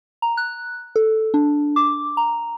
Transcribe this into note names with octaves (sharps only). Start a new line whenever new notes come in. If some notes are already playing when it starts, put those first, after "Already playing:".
A#5
F#6
A4
D4
D6
A#5